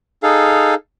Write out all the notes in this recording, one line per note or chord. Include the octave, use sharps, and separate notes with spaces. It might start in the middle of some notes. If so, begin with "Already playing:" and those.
D#4 G#4 A4 F5